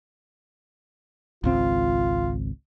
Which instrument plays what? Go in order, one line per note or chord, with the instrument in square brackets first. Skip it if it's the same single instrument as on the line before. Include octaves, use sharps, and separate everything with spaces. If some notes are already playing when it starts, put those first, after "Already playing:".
[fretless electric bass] G#1 C#2 C4 [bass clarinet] F4